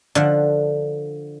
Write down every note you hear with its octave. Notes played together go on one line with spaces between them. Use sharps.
D3 F3 F#5